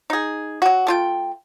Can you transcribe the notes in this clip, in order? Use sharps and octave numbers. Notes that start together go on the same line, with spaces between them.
D#4 G#4
F#3 F#4
A3 F4 G5